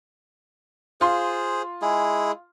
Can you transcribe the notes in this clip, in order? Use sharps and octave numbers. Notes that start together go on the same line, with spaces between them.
F4 G#4 C5 C6
G#3 E4 G#4